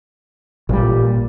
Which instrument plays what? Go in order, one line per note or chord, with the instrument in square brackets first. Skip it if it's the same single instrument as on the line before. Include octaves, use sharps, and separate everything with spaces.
[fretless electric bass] A1 G3 [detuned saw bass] A#2